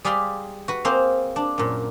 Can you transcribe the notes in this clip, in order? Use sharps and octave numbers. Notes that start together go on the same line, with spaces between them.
G3 G#4 D5 F5 B5 C6
F#4 B4
A#3 C4 G#4 C5 F5
D4
F#2 A#2